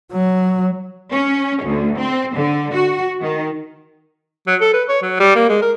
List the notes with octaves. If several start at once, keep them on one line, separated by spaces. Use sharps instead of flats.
F#3
C#4
D2
C4
D3
F#4
D#3
F#3
A4
B4
C#5
F#3
G3
A#3
G#3
A#4